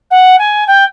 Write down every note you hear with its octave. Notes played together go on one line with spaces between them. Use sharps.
F#5
G#5
G5